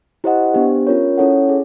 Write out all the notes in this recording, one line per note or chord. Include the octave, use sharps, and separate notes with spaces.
E4 G4 C5 D#5 F#5
B3 D4 G4 C5
C#4 F4 A#4 C#5
C#4 E4 A4 C#5 F#5
G#4